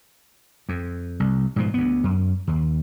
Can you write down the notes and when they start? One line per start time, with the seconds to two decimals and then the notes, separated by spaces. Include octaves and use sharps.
0.69 F2
1.20 C2
1.56 G#2 B2 F3
1.74 D2 B3
2.04 F#2
2.47 D#2